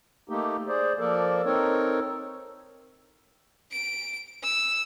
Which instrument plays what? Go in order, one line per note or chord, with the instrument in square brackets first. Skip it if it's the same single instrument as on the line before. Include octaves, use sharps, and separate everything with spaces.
[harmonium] A3 A#3 D#4 G4
G#4 C5 D5
F3 A#3 A4 A#4 D5
C4 D#4 A4 A#4 C#5
[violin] D7
E6